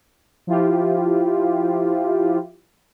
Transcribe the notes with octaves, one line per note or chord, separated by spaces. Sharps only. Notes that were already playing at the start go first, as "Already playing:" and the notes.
F3 E4 F4 G4